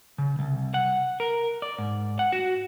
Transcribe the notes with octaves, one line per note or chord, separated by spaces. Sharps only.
C#3
C2
F#5
A#4
D5
G#2
F#5
F#4